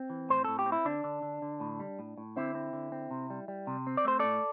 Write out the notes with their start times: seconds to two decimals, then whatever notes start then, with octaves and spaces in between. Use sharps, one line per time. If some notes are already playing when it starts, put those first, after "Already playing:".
Already playing: C4
0.10 E3
0.29 A2 C5
0.44 A2 A4
0.59 G4
0.66 C4
0.72 E4
0.85 D3 D4
1.04 D3
1.22 D3
1.42 D3
1.60 A2
1.80 G3
1.99 A2
2.18 A2
2.36 D3 C4 E4
2.55 C4
2.73 D3
2.92 C4
3.11 C3
3.30 G3
3.48 G3
3.67 C3
3.87 C4
3.97 D5
4.05 A3 C5
4.19 A2 A4 D5